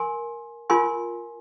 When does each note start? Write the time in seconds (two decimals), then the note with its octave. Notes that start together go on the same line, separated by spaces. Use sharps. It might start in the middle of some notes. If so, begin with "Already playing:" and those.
Already playing: A#4 G#5 C6
0.70 F4 A#4 G#5 C6